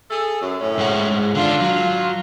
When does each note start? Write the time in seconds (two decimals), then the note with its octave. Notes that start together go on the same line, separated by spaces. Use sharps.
0.10 G#4 A4
0.42 F#2
0.61 D2 A2 C#4
0.77 G#2 G#3 F#5
1.35 D3 D4 F4
1.61 F#3